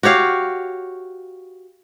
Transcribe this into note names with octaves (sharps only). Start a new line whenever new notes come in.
F#4 G4 C#5 F5